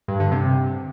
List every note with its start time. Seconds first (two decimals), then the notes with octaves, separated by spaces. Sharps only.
0.08 G2
0.20 D3
0.32 C3